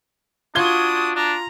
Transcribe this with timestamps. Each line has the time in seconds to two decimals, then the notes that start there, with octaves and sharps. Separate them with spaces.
0.55 D4 F4 F#4 D#6 G#6 G7
1.16 D4 A#5